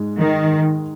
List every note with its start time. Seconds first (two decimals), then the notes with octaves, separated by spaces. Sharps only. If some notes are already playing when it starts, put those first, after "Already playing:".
Already playing: G#2 G#3
0.18 D#3